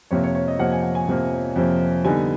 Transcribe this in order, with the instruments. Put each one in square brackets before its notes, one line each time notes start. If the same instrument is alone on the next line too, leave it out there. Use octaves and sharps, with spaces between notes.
[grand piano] F2 C3 F3 A#3 C#5
C#5
C#5
D#5
F2 C3 F3 A#3 F#5
G#5
F#5
G#5
F2 C3 F3 A#3
F2 C3 F3 A#3
D3 G3 B3 D#4 G#5